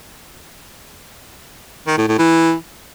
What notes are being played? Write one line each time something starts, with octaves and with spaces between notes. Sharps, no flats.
D#3
A2
A2
E3